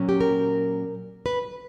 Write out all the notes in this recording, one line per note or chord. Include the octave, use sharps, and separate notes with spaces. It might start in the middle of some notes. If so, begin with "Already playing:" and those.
Already playing: A#2 F#3 C#4
G4
A#4
B4